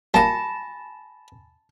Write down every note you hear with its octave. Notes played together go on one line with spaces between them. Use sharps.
G3 A#3 G#5 A5 B5 A#6